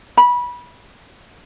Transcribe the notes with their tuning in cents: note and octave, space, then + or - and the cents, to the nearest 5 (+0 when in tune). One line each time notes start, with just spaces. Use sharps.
B5 -20